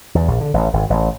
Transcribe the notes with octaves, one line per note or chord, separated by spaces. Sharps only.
E2
A#1
D3
A1
G#1
A1